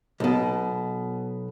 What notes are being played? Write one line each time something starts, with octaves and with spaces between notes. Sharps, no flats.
B1 B2